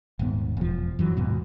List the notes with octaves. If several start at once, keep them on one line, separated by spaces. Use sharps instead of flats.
D#1 G#2 B3
E1 F3
F#2 E3 F#3
D#2 G#2 B2